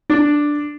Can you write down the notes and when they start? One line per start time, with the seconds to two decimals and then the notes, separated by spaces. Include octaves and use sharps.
0.10 D4